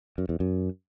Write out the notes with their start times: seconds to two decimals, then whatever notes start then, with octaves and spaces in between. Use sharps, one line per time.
0.18 F#2
0.29 E2
0.40 F#2